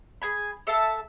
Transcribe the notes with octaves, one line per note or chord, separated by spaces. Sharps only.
G#4 G#5 B5
A4 E5 F5 A5